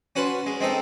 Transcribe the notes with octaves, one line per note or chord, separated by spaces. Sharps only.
C#4 F#4 B4 A5 B5 C6
G#3
G#3 C4 D#4 A4